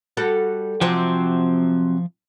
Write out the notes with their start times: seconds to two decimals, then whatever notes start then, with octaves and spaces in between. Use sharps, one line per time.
0.17 G3 F#4 A4
0.81 C3 F3 F#3 C4